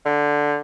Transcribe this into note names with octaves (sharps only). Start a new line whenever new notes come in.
D3